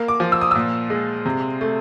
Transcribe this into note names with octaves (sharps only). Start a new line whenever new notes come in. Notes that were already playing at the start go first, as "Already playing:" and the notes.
Already playing: A#3
D6
F3
E6
D#6
A#2 E6
G#3
C3
A3